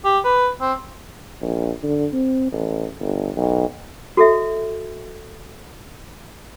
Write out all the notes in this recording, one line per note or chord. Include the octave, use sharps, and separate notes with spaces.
G4
B4
C4
A#1
D3
C4
A1
G1
B1
F#4 A4 D#5 E5